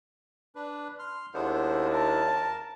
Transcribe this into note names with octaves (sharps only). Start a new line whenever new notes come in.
D4 B4
C6 F6
D#2 G#3 B3 D4 E4 C5
A#4 A5